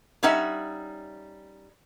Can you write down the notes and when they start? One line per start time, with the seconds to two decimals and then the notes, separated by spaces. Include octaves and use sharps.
0.23 G3 C#4 D#4 E5 F#5